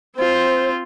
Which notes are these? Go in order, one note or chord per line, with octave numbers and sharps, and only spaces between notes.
C4 F4 C5